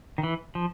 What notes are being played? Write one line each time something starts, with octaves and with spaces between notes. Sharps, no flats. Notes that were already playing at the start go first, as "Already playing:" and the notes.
D#3
E3
F3